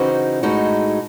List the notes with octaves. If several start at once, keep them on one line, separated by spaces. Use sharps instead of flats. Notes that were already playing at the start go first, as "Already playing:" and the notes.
Already playing: C#3 E3 C4 D#4 F#4
A2 G#3 D#4 F#4